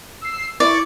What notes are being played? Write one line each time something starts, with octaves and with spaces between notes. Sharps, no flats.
E6 C7
E4 D5 C#6